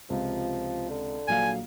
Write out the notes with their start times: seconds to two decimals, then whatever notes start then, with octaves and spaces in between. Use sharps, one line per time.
0.10 C#2 C3 F3
0.90 D3
1.28 A#1 F#3 F5 G#5